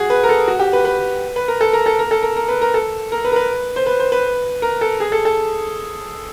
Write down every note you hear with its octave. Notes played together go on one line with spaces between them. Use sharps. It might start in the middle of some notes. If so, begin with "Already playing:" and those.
Already playing: F#4 G#4
B4
A#4
A4
F#4
G4
B4
B4
B4
A#4
A4
A#4
A4
A#4
A4
A#4
A#4
B4
A#4
A4
A#4
B4
A#4
B4
C5
B4
C5
B4
A#4
A4
G#4
A4
A4